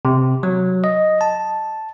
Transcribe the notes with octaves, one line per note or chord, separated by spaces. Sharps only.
C3
F#3
D#5
A5